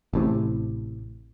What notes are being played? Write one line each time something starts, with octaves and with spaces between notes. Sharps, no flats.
A1 A2 C3